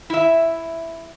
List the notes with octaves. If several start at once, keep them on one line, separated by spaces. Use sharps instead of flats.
E4 E5